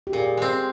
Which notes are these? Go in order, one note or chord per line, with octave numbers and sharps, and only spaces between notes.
G4
A#2 G#4
G#3 C4